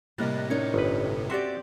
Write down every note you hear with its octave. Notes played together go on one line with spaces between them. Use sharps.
A2 C3 G3 A#3 A#4 D#5 F#6 A6
C#4 D#4 A#4 C#5 D5
G1 B4
C4 F#4 G4 D5 E5 C6 A6